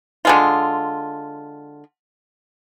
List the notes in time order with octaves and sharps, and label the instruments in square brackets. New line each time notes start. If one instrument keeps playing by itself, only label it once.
[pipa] D3 G#3 F4